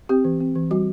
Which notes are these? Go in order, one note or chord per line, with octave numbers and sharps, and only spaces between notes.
C4 G4
E3
C4
E3
G3 F#4